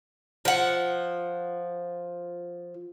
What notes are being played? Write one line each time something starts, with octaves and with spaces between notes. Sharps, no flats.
F3 F#5